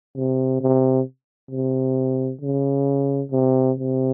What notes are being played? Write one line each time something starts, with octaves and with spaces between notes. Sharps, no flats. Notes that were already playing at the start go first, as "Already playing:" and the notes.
C3
C3
C3
C#3
C3
C3